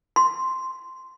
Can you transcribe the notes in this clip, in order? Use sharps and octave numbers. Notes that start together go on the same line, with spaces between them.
C6